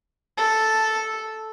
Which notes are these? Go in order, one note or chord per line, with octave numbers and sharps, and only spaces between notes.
A4